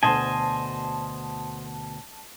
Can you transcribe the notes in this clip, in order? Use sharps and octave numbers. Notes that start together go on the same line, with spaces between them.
D2 G2 B2 C5 D#5 G#5 A5